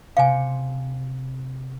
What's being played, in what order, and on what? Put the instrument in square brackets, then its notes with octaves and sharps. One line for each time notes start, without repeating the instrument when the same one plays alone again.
[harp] C3 C5 C#7 [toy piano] F5 G#5